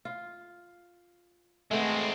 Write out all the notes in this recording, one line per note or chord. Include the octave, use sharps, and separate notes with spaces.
F4
G#3 A3 B3 C4